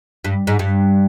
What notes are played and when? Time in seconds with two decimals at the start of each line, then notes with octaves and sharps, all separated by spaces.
0.24 G2
0.47 G#2
0.59 G2